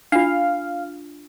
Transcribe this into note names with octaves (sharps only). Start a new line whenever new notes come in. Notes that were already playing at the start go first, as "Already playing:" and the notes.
D4 F4 F5